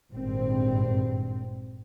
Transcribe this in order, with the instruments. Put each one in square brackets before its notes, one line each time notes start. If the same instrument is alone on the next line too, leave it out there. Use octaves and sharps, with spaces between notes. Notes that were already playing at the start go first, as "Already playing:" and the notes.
[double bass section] G#1 G2 A#2 C4